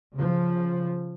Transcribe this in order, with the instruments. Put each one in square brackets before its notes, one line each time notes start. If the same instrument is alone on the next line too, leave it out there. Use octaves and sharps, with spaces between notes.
[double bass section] C#3 F3